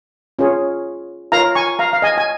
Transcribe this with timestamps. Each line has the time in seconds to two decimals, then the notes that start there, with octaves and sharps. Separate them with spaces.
0.39 C#4 F4 G#4 C#5
1.32 F4 A#4 C#5 F5 A#5
1.55 G#5 C#6
1.79 F5 A#5
1.93 F5
2.02 D#5 G#5
2.18 G#5